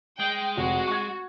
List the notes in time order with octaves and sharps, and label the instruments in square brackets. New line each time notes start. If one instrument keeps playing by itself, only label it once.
[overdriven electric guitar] G#3 [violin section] G5
[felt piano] F1 [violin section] F#4
[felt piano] C#6 G#6